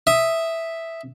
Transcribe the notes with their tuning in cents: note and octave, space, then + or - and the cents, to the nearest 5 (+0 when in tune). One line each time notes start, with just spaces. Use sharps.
E5 +0 D#6 +0